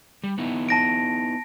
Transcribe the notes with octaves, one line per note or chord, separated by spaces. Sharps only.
G3
B3 D#4 E4
A5 A#6 D7